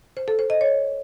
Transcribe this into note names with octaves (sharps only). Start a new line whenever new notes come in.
C5
A4
C5
D#5
C#5